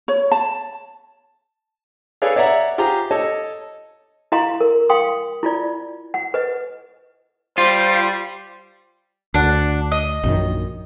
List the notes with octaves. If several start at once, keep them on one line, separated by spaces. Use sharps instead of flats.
C#5
A5
G#4 A4 B4 C#5 D5 F5
C#5 D5 E5 F#5 A#5
F4 G4 G#4 C5 A#5
A4 C#5 D#5 A5
E4 D#5 F5 A#5 C6
A#4
F5 G5 C6 D#6
E4 F4 D5
F#5
B4 D#5
G3 F4 C5
D2 D4 F#5
D#5
A#1 F#2 D#3